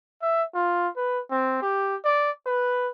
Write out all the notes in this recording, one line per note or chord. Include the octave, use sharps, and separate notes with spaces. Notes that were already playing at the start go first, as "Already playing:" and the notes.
E5
F4
B4
C4
G4
D5
B4